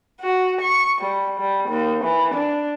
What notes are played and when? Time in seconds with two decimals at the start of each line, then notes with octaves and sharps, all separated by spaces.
0.20 F#4
0.61 C#6
1.01 G3
1.39 G3
1.68 D#2
2.04 E3
2.34 D4